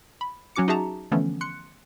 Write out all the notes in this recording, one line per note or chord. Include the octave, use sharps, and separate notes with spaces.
B5
F#3 C#4 F#4 D6 C#7
D#4 F#4 G#4 E5 A5 A#5
D3 E3 F3 A3 B3 C#4
C6 F#6 C#7